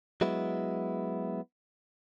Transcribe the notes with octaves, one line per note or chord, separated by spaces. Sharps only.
F#3 G#3 B3 E4